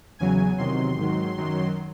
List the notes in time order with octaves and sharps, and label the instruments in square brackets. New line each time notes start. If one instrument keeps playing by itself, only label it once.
[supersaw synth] E2 C#3 F#3 G#5
E2 C3 D#3 F#3 C6
G#2 D#3 F#3
F#2 D#3 F#3